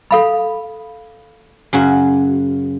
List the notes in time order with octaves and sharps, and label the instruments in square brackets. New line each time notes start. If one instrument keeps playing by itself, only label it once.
[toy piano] A4 F5 B5
[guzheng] F#2 C#3 F#4